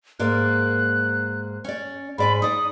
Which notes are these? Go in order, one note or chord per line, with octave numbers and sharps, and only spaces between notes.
G#2 A#3 D5 F#6
C#4 D5
G#2 D5 G#5 B5
D#4 D5 D#6